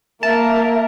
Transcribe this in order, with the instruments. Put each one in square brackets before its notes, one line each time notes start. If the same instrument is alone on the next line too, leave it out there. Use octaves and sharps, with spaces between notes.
[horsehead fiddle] A#3 [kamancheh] A#4 [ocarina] E5 [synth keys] A5